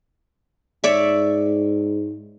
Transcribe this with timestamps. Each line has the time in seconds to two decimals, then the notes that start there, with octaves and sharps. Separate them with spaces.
0.84 G#2 C#5 D5 E5